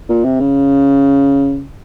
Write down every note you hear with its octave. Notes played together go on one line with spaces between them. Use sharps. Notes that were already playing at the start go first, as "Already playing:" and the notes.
A#2
C3
C#3